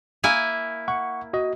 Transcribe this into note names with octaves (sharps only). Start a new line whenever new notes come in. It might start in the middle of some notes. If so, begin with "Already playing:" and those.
A#3 E4 G#5
F#5 C#6
F#4 D#5